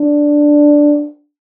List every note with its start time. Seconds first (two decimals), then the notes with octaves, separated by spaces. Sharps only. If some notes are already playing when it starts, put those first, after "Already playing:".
Already playing: D4